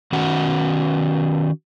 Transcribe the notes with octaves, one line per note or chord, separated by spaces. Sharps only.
D#3 C#4 F#4 F#5